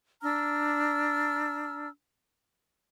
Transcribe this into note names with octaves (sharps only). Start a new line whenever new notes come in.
D4 A#5 E6 F6